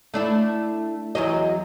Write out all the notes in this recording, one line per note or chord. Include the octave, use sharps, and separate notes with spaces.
A3 D4 E4
E2 F#3 D#5